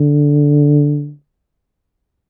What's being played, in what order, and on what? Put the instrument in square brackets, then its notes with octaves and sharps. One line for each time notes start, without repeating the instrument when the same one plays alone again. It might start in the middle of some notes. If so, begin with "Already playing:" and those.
Already playing: [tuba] D3